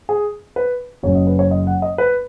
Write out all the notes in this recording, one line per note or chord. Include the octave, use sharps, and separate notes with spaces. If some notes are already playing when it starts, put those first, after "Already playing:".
G#4
B4
F#1 F#2 F#3 C#4 C#5
D#5
B4
C#5
D#5
F#5
D#5
B4